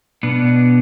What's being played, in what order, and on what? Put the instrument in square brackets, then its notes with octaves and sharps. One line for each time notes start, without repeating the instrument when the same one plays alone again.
[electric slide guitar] B2 B3 D4